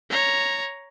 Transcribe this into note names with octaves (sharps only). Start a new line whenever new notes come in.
C#5 A#5